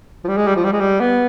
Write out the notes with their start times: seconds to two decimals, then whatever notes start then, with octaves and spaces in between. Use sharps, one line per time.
0.24 F3
0.28 G3
0.37 G#3
0.47 G3
0.56 F3
0.64 G3
0.73 G#3
0.80 G3
1.00 B3